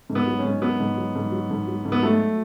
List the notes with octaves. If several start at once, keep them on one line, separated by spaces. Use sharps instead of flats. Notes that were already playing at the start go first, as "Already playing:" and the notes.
G#2
B3
F#3
C#4
G#2
F#3 B3
G#2
F#3
G#2
F#3
G#2
F#3
G#2
B3
F#3 A3